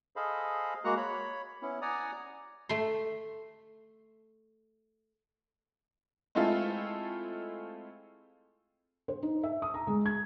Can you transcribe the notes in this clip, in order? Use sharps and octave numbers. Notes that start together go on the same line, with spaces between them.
G#4 A4 C5 D#5 F5 B5
G#3 A#3 F#4 F#5 A#5 F#6
C#5 B5
B3 C#4 E4
D5 F#5 G#5 A#5 D#6
A3 C6
G#3 A3 C4 E4 F4 A4
C5
D#4
E5
D#6
A#5
G#3
G#6